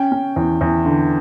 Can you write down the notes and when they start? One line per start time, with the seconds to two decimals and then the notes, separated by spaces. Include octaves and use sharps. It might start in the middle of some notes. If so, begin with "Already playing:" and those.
Already playing: C#4 G5
0.12 C#4
0.36 E2
0.61 E2
0.85 D3